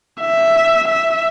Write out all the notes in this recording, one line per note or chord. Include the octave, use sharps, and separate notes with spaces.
E5
E5